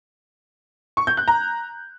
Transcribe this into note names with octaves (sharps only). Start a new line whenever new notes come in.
C#6
G6
F#6
A#5